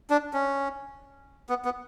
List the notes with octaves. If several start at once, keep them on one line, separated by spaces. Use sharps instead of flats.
D4
C#4
B3
B3